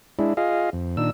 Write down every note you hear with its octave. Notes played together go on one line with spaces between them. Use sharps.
G#3 D4 E4
F4 G#4 D#5 F5
F2
A#2 D#3 D4 E6